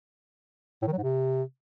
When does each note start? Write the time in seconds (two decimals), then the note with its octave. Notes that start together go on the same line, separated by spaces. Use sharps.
0.82 A2
0.87 D#3
0.92 F#3
0.98 G#2
1.03 C3